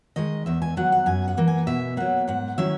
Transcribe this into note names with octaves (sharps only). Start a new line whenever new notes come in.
D#3 G#3 D#5
E2 E5
G#5
D#3 F#3 F#5
F#5
F#2 G#5
F#5
E3 A#3
G#5
B2 E5
F#3 A#3 F#5
G#2 F#5
D#3 F#3 C#4 E4 E5